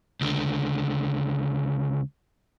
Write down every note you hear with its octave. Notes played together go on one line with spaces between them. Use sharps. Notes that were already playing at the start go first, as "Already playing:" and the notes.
C#2 D3